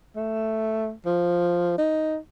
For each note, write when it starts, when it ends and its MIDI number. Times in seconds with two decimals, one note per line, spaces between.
0.16 0.91 57
1.05 1.77 53
1.78 2.18 63